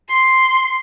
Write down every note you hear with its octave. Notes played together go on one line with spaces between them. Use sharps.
C6